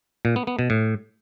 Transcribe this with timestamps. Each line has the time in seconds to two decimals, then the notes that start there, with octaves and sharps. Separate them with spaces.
0.25 A#2
0.36 B3
0.47 B3
0.59 B2
0.70 A2